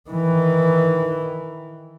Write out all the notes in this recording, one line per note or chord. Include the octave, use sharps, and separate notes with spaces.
D#3 E3